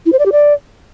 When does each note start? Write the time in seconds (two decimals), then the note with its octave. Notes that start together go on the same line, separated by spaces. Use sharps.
0.06 E4
0.12 C5
0.19 D5
0.26 G4
0.32 D5